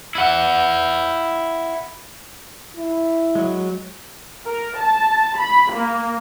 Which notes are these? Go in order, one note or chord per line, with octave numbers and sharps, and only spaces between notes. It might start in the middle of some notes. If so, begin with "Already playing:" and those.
E4 F#5
E4
F#3 G#3
A#4
A5
B5
A#3